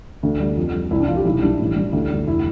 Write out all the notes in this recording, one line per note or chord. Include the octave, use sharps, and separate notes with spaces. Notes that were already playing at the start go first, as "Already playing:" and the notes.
D2
G3
F2
G3
C2 E4
D4
F3 F4
G4
B1 E4
G3 D4
A1
G3
D2
G3
F1 E4